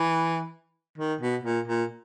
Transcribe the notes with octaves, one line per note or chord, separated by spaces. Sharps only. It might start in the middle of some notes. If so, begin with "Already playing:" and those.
Already playing: E3
D#3
B2
A#2
A#2